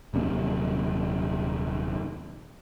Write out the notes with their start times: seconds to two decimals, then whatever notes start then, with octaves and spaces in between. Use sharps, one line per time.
0.14 D#1 F#2 C3 A#3